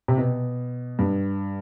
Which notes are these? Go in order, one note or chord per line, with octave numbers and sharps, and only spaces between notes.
C3
B2
G2